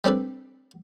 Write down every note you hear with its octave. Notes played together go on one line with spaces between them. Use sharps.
G3 C4 D4 A4 B4